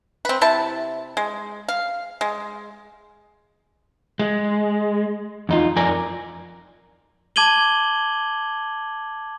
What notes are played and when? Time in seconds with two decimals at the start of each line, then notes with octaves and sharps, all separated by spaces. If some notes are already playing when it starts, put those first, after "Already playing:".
0.25 C4 B4
0.41 C3 E4 A5
1.17 G#3
1.68 F5
2.21 G#3
4.19 G#3
5.49 E2 D#4 F4
5.76 F2 A#4 D5 G#5 A#5
7.36 A5 D6 G#6 D#7 F#7 G7